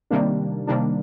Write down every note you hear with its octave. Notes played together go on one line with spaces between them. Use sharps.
C3 D#3 G3 A#3 D4
C3 D#3 G3 A#3 D4